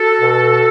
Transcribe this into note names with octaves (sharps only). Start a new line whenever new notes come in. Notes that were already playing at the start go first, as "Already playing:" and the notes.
Already playing: F#4 A4
B2